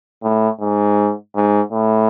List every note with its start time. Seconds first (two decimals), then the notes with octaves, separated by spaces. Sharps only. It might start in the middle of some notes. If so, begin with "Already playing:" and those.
0.23 A2
0.60 G#2
1.35 G#2
1.72 A2